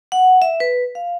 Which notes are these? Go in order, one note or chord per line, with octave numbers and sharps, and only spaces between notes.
F#5
E5
B4
F5